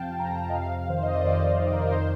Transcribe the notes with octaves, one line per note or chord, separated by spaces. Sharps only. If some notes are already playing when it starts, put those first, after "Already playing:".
Already playing: F2 C3 F3 F5 G5 A5
F2 A#5
D#5
C3 F5
D#3 C5
D#5
D5
F2 C5
F2 D5
C5
A#4
C5
D#3 C5